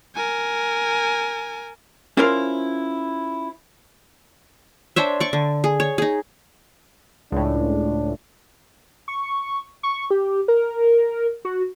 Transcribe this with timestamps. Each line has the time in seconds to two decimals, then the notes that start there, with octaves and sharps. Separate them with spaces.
0.16 A#4 G#5
2.17 C#4 E4 F4 A#4 C5 F5
4.96 D4 C5 C#5 E5
5.20 D5 C#6
5.33 D3
5.64 G#4
5.80 C#5
5.98 D#4 G#4
7.32 C#2 A2 D4
9.08 C#6
9.83 C#6
10.11 G4
10.48 A#4
11.45 F#4